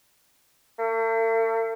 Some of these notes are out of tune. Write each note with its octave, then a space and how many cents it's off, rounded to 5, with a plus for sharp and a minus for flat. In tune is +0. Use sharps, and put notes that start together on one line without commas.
A3 +45